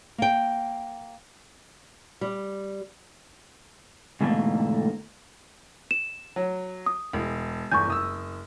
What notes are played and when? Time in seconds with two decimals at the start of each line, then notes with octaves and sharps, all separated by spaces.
0.18 A#3 G5
2.21 G3
4.21 G#2 B2 D3 E3 A3 A#3
5.91 E7
6.36 F#3
6.86 D#6
7.13 E1
7.72 G1 E2 G#5 C#6 G6
7.88 F#1 D#6 E6